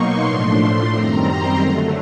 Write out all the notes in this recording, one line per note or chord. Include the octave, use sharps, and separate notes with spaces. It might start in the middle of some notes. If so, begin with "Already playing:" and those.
Already playing: B2 F#3 A#3 D#4 C6 C#6
A2 F3 A3 D4
F#2 D#3 G3 C4 A#5
C6
D3 F#3 A3